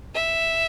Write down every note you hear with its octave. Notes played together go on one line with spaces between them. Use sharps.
E5